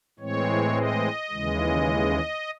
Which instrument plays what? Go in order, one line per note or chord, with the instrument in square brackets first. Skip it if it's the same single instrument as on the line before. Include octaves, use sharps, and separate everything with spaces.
[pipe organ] A2 E3 G#3 C4 C#5
D#5
D#2 C#3 E3 G#3